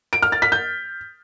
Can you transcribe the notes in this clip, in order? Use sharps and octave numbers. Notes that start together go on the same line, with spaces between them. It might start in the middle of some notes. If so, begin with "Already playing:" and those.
D7
F6
A6
B6
G6